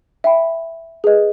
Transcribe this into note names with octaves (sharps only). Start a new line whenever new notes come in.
E5 G5 B5
G#4 B4 D#5